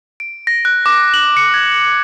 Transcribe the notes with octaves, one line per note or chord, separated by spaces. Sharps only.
D7
A#6
F#6
D6
F#7
C#7
G#6